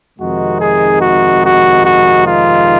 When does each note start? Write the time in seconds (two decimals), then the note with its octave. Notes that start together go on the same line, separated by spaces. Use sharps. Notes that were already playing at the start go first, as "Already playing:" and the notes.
0.19 F2 C3 D#3 G#3 D#4 F#4
0.59 G#4
1.01 F#4
1.42 F#4
1.84 F#4
2.24 F4